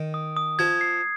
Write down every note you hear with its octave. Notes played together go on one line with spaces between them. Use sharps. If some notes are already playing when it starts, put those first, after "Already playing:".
Already playing: D#3
D#6
D#6
F3 G#6
C7